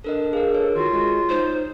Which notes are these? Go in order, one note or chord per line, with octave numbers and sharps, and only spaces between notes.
D4 A4 A#4 D#5
G#4 A#4 F5
A4 C#5
D#3 F4 F#4
G#3 F#4
D#4 C5